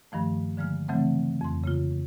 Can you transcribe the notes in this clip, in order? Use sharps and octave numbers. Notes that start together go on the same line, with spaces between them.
G2 D#3 F3 A3
D3 F3 G#3 A#3 F6
C#3 E3 F#3 A3 C4
F2 C6
C#3 A#3 F4